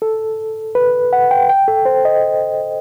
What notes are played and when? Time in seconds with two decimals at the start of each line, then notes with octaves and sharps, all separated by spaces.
0.02 A4
0.75 B4
1.13 F#5
1.31 G5
1.49 G5
1.68 A4
1.85 C5
2.05 D#5